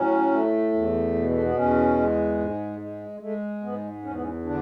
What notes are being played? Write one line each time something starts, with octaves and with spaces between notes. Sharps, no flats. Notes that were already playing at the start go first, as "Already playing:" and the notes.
Already playing: A2 F#3 C#4
A3
E2
B2
A3
B3
E2 C#4
G#3
G#2
G#3
G#3 A3
G#2 B3
E2 C#4
B3
C#4
D3 D4